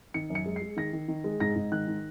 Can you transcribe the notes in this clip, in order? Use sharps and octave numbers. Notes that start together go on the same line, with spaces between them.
D#3 C#7
F#2
C#7
G#3
C7
G#3
D#3 A#6
D#3
D#3
G#3
G#2 A#6
G#2
D#3 F#6
D#3